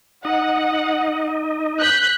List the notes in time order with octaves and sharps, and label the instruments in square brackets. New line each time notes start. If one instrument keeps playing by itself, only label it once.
[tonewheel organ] D#4 D#5 [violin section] F#5
[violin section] F#6 G6 B6